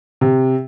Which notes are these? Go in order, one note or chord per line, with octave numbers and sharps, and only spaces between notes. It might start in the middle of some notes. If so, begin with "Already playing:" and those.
C3